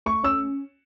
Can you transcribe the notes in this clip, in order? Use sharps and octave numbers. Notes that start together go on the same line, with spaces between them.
A3 C#6
C#4 E6